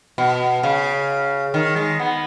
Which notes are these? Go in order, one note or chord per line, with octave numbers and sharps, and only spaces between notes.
B2
C#3
D#3
G#3
B3